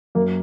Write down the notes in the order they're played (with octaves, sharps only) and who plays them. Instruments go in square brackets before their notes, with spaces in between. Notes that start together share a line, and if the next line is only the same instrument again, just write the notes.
[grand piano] F#2 A#3